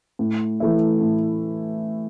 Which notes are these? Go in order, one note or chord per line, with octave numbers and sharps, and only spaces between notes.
A2
E3 A3 E4
A2